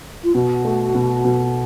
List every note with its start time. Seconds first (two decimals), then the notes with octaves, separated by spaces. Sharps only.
0.23 F4
0.35 B2 F#4
0.65 A3
0.95 B2
1.25 B2